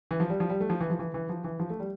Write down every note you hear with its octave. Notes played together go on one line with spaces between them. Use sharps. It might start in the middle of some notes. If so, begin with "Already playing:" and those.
E3
F3
G3
F3
G3
A3
F3
E3
F3
E3
E3
F3
E3
F3
A3
G3